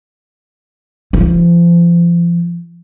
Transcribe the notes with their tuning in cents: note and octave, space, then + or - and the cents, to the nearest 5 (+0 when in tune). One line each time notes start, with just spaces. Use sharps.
F3 -35